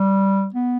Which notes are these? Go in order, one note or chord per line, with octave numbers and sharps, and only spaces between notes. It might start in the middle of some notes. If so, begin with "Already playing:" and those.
Already playing: G3
B3